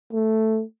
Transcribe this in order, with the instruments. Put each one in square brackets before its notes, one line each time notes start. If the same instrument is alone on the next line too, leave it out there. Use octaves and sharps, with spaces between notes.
[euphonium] A3